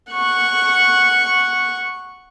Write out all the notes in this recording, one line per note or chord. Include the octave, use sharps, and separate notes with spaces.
F#5 C#6